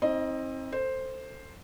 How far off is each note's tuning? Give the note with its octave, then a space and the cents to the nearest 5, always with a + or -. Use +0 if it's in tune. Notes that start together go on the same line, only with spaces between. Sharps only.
C4 +25 D#4 +45 D#5 +0
A4 +25 C5 +5